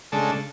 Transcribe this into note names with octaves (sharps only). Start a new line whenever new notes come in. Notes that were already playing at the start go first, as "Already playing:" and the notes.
C#3 G#3 D4 A4